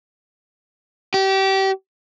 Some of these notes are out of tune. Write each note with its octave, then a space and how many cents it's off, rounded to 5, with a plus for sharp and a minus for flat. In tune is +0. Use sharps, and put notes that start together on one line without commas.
G4 -25